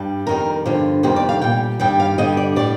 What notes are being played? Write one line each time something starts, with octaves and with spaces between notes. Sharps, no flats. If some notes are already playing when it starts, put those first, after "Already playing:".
Already playing: G2 G3
F2 D#3 G3 A#4
G2 D3 F3
F2 C3 D#3 G3 C5
D5
F5
A#2 G3 G5
G2 D#3 G3 G5
F5
G2 D3 G3 D#5
D5
A2 G3 D5